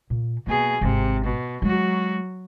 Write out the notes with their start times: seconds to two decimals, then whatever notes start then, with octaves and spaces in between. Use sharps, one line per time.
0.10 A#2
0.47 B2 A#3 G#4
0.81 G#1 C3
1.24 B2
1.62 F#3 G#3 F#4